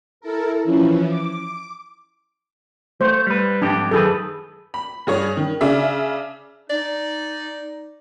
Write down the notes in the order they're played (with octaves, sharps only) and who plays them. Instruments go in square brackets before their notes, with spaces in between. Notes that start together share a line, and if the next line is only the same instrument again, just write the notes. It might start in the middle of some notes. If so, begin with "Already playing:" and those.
[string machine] E4 A4 A#4
E3 F3 C#4 E4
D6
[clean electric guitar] A3 [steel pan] C5
[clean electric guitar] G3 B4
[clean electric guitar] F2 G#2 G4 [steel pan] D4
[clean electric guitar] F#2 D#3 B4 [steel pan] G#4 A4
[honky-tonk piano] B5
G2 G#4 C#5
D#3
C#3 D4 E5
[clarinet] D#4 [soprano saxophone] D5